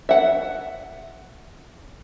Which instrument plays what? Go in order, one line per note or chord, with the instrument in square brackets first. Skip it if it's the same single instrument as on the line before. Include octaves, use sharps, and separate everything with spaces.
[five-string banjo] E5 F#5